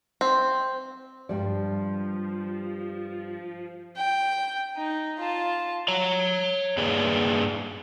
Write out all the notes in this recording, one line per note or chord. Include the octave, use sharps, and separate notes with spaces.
C4
G2 F3 G3 D5
G5
D#4
F4 A5
C#5 A#5
G2 A#3 G#4 B4 D5